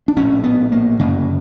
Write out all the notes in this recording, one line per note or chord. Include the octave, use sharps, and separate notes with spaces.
D4
A#1 A2 C#4
B3
A#3
G1 F#2 C#3 A#3